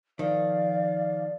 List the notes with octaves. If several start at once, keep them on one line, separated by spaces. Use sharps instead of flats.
D#3 F3 D5 F5